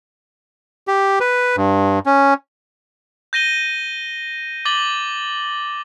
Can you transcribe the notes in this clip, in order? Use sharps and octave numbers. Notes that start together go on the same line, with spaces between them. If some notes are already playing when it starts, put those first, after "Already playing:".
G4
B4
G2
C#4
G6 A#6 D#7 G7
D6 A6 F#7 G7